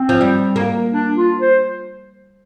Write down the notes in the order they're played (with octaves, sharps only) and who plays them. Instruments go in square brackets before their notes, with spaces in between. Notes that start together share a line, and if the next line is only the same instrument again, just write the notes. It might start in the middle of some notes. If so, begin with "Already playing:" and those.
Already playing: [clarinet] C4
[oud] F3
G3
A#3
[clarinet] D4
F4
C5